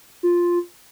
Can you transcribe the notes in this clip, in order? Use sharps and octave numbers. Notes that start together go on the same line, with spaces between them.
F4